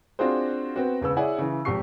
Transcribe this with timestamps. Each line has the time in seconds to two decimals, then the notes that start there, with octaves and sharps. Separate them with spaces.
0.19 C4 D4 F4 F#4 G#4 C5
0.76 B3 C4 F#4
1.01 E1 C#3 B3 E6
1.16 E4 G#4 C#5 D5 F#5 G#5
1.38 C#3 E3
1.65 G#1 F2 G4 C#6 C7